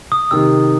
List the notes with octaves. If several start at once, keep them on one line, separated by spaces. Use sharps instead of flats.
D#6
C3 D#3 E6